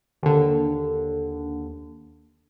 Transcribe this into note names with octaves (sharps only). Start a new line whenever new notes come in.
D#2 D3